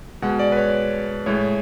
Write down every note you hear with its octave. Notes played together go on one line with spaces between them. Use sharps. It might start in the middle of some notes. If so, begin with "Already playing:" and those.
B2 G#3 F#5
D5
B4
C#5
A2 G#3 C#5